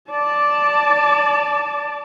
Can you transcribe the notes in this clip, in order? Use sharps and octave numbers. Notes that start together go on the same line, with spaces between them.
D5 A5